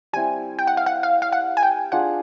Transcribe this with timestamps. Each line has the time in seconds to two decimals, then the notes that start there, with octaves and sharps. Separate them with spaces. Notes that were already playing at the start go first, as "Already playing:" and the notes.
0.13 G3 C4 E4 G#5
0.59 G5
0.67 F#5
0.77 F5
0.86 F#5
1.03 F5
1.22 F5
1.32 F#5
1.57 G#5
1.63 G5
1.92 D4 F4 G#4 F#5